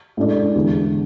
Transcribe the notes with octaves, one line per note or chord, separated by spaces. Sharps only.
A2 G#3 D4 A4 D5
E2 D3 G#3